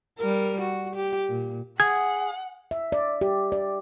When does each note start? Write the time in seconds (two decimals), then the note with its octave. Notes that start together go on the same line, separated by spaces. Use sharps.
0.19 G3 A#4
0.61 F#4
0.95 G4
1.29 A#2
1.80 G#4 F#5 G#6
2.71 E5
2.92 D5
3.21 G4
3.52 D5